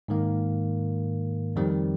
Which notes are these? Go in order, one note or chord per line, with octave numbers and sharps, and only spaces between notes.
G#2 D#3 A#3
F2 D#3 G3 C4